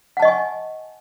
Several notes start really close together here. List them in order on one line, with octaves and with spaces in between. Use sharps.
F#5 A5 D#5 C#6 G#5